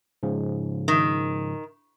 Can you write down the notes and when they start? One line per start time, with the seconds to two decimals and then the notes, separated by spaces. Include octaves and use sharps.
0.23 G#2 C#3 F3
0.88 D#3